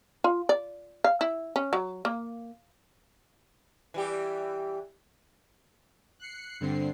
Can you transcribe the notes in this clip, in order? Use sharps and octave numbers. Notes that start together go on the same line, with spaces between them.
F4
D5
F5
E4
C#4
F#3
A#3
E3 G3 G4
F#6 C7 C#7
G2 D3 C4 C7